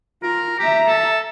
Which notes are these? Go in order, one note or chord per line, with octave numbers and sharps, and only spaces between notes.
F4 A#4
G4 E5 A#5
A4